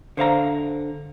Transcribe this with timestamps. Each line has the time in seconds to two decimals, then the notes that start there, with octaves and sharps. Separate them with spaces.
0.17 D3 C5 F5 A#5